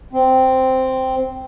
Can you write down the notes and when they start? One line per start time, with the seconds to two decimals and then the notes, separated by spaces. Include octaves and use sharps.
0.13 C4